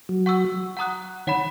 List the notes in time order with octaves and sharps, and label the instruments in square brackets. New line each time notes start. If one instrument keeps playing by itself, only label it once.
[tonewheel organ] F#3
[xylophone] F#5 C#6 E6
F#5 A#5 D#6 F#6
[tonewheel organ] D#3 [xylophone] C#5 F#5 B5